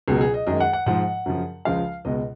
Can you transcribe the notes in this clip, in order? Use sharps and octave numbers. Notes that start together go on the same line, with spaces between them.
C#2 B2 F#3 G#4
G#4
D#5
F#2 D#3 G#3 D#5
F#5
F#5
G#2 F3 G#3 F#5
F#2 C#3 F3
C#2 C#3 F3 G#3 F5
C#2 B2 G#3 D#5